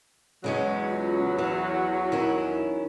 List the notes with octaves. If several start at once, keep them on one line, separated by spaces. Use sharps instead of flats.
E2 C#3 F#3 G#3 C#4
F4
E3 F#4
D#3 C#4 E4